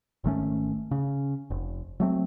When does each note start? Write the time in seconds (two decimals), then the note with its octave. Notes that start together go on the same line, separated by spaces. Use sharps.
0.24 G#1 D#3 A3 C#4
0.91 C#3
1.50 F1
2.00 F#3 A3 C4